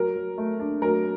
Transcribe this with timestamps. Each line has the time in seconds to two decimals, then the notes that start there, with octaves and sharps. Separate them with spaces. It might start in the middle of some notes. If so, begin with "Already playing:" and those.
Already playing: F#3 A#4
0.16 F#3
0.38 A3
0.59 D4
0.82 F#3 A#4